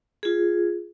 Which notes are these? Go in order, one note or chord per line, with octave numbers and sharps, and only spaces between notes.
F4 G#4